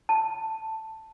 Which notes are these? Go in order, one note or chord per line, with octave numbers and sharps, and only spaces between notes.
A5